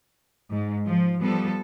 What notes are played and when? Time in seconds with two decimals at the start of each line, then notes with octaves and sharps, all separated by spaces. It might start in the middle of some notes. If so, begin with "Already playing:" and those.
0.49 G#2
0.85 F3
1.21 F3 G3 B3 A4